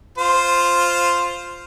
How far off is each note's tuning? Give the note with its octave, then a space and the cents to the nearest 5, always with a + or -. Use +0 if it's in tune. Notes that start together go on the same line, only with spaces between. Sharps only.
F4 +0 C5 +0